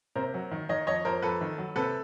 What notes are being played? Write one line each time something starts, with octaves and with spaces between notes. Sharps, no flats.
C3 A#4 C5
F#3
D#3
D#3 C#5 D#5
F2 C#5 D#5
F2 A#4 C5
F2 A4 B4
D#3
F#3
C3 A4 B4